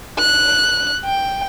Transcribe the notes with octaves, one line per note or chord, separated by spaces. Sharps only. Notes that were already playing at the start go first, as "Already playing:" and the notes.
F#6
G5